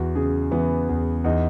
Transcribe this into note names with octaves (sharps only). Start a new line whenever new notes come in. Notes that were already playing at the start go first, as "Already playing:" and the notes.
Already playing: E2 F#4
C#3 G#4
E3 B3
E2
E2 D#4